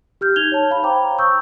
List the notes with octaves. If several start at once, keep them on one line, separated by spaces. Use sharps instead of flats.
G4 F6 G6
D#4 G#6 F7 G7
C#5 A5
F5 B5
C5 G5 A#5 D6
A#5 C#6 D#6 E6 G6